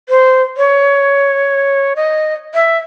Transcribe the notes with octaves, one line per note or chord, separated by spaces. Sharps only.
C5
C#5
D#5
E5